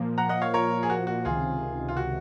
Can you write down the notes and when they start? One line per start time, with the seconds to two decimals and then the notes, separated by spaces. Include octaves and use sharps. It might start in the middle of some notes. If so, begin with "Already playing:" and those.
Already playing: A#2 F3 A#3
0.18 F#5 A#5
0.29 D#5 F#5
0.41 C#5 F5
0.54 A#4 C#5
0.83 G#4
0.90 F#4
1.07 F#4
1.25 C#2 C3 D#3 F4 G#4
1.88 F4
1.97 F#4